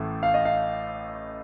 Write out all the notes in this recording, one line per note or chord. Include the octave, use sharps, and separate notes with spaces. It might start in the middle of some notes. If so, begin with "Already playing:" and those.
Already playing: A1 A2 A3
F5
D#5
F5